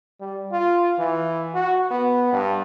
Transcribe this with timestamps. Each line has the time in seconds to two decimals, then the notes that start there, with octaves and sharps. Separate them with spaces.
0.20 G3
0.52 F4
0.99 E3
1.55 F#4
1.91 B3
2.33 G2